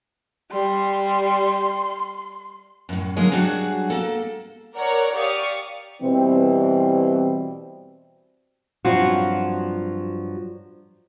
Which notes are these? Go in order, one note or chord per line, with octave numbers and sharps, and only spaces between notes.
G3 C6
F#2 A2
D3 F#3 G#3 A#3 C#4 G#4
F#3 G3 D4 F#4 G#4
A#3 A4
A#4 C#5 D5 F#5
G4 D5 F5 C#6 D#6
B2 E3 G3 C4
G2 F3 F#3 C4 F4 F#4